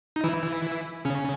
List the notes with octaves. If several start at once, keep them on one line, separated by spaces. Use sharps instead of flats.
D#4
E3 E4
C#3 C#4